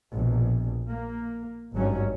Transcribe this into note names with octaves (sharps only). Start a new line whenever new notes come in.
A#1 B2
A#3
G#1 G2 F#3 C#4